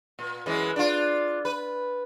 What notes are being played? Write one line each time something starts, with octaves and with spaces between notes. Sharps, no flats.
A#2
F#2 E3 G#3
D4 F4
B4